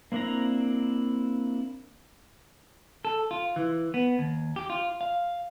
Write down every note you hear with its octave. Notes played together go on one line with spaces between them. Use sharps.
A#3 C4 D4 E4 A#5
A4
F4
E3
B3
D#2
G4
F4
F5